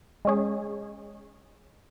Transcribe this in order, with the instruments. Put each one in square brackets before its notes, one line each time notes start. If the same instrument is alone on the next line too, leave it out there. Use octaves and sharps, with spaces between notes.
[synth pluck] G#3 C#4 G#4